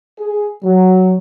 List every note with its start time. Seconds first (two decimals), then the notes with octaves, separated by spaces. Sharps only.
0.19 G#4
0.64 F#3